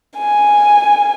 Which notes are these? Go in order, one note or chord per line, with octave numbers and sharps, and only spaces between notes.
G#5